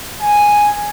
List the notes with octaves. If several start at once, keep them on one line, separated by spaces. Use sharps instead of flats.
G#5